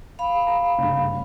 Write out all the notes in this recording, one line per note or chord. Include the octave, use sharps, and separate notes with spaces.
F5 B5
A#5
G2 C#3